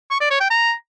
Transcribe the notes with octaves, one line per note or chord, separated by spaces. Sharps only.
C#6
D5
C#5
G5
A#5